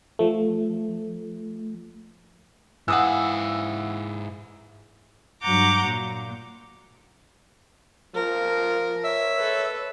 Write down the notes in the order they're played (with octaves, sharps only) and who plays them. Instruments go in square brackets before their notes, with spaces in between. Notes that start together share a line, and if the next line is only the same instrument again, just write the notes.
[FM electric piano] F3 A3
[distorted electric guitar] G#2 F5 [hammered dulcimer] E3 [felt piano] F#5 D#6 E6
[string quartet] G2 F#3 F#5 A#5 D6 G6
A#2
[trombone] F3 [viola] A#4
[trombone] C#5 [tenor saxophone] E5
[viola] A4 B4